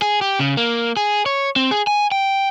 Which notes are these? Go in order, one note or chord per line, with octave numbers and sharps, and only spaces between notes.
G#4
G4
C#3
A#3
G#4
C#5
C4
G#4
G#5
G5